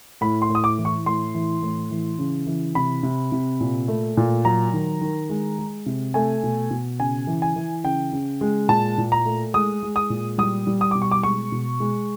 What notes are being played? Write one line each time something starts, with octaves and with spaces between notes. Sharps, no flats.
A2 B5
C6
A2
D#6
D6
E3
C#6
A2 C6
E3
A2
E3
C#3
E3
C3 B5
C3
C3
A#2
A3
A#2
F#3 A#5
D#3
D#3
G#3
G#3
C3
A3 G#5
B2
B2
C#3 G#5
E3
G#5
E3
C#3 G5
C#3
G#3
A#2 A5
A#2
A#5
A3
G#3 D#6
G#3
D#6
A#2
G3 D#6
G3
D#6
B2 D6
C#6
D6
G#3 C#6
B2
G#3